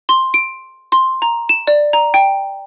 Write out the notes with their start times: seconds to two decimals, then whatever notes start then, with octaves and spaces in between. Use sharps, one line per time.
0.09 C6
0.34 D7
0.92 C6
1.22 A#5
1.49 E7
1.67 D5
1.93 A#5
2.14 G5